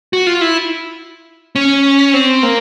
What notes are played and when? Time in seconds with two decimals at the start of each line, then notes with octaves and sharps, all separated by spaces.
0.13 F#4
0.27 F4
0.41 E4
1.56 C#4
2.14 C4
2.43 A#3